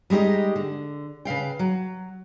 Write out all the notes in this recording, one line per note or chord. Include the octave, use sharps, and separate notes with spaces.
G3 G#3 D#4 G4 D#5
D3
C#3 B4 F5 G5
F#3